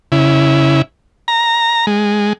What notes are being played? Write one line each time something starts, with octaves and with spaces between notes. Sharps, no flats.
C#3 E4
A#5
G#3